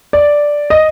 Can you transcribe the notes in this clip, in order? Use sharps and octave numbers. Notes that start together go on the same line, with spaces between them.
D5
D#5